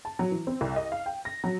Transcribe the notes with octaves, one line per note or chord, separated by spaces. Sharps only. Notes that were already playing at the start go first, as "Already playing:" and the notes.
A5
F#3
E3
C4
C2
D#5
F5
G5
A#6
F#3